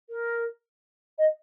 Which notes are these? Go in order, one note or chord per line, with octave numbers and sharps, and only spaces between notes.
A#4
D#5